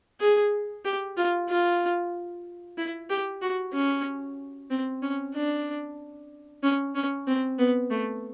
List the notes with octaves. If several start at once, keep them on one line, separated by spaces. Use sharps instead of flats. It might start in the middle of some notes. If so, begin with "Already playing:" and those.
G#4
G4
F4
F4
E4
G4
F#4
C#4
C4
C#4
D4
C#4
C#4
C4
B3
A3